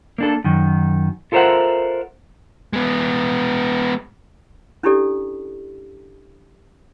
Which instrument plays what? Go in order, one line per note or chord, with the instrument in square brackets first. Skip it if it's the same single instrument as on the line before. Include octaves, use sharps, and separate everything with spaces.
[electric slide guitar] A#3 D4 A4
F#2 D#3
F4 A4 A#4 C5 E5 F#5
[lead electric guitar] G#3 B3
[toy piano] C#4 D4 E4 G4 A4 D5